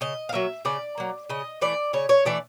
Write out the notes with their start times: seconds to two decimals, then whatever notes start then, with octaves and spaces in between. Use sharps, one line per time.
0.01 C#3 D#5
0.29 F5
0.33 F#3 A#3 E5
0.65 C#3 D5
0.98 F#3 A#3
1.29 C#3 D#5
1.61 E3 A3 D5
1.93 C#3 C#5
2.09 C#5
2.25 E3 A3 D5